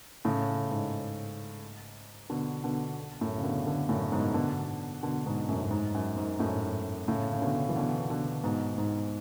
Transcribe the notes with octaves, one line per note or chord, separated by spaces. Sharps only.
A2 C#3
G#2
B2 D3
B2 D3
F#2 A2
C#3
B2 D3
B2 D3
F#2 A2
G#2 B2
B2 D3
B2 D3
G#2 B2
F#2 A2
F#2
G#2
F#2
G#2
F#2 A2
A2 C#3
C#3
B2 D3
E3
B2 D3
B2 D3
G#2 B2
G#2